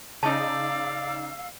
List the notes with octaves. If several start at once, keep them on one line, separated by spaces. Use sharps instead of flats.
C#3 D#4 D5 F5 A5 E6